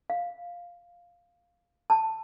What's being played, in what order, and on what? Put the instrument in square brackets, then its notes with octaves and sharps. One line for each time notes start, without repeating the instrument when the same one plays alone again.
[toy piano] F5
A5